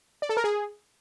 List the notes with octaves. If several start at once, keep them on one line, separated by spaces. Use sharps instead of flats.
D5
A4
A#4
G#4